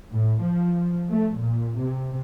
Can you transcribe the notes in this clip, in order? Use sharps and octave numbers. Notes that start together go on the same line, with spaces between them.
A2
F3
A3
A#2
C3